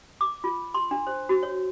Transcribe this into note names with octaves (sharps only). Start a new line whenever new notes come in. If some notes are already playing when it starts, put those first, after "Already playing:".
D6
F4
C6
D4
C5
F#4
C#5